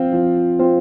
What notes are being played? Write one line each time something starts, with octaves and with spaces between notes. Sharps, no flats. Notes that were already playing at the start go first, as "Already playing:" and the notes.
Already playing: F3 C4 F4 C5
F3
C4 F4 C5